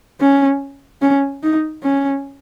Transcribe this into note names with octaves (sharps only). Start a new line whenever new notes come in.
C#4
C#4
D#4
C#4